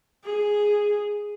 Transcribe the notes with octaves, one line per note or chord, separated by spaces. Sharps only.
G#4